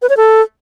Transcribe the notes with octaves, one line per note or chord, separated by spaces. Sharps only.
B4
C#5
A4